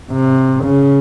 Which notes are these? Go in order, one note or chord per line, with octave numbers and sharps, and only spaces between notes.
C3
C#3